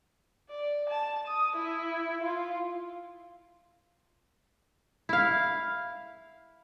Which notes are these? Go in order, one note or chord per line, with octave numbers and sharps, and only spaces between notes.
D5
A5
D#6
E4
F4
E4 F5